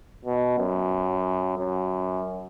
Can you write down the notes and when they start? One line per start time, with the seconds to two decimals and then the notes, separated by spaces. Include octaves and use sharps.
0.25 B2
0.59 F#2
1.59 F#2